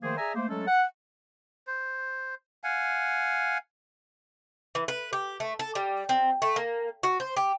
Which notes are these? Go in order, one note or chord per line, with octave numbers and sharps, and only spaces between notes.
D#3 F3 A3 A#3 G#4 C5
G#4 D5 E5 G#5 A#5
A3 A#3 C5
F#3 G#3 A3 C#4 A4
F#5
C5
F5 F#5 G#5
E3
B4
G4
A3
A4
G3
C4
A3
A#3
F#4
C5
G4